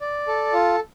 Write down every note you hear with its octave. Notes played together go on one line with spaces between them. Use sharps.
D5
A4
F4